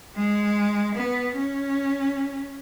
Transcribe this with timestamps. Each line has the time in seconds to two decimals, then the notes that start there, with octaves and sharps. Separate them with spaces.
0.16 G#3
0.96 B3
1.36 C#4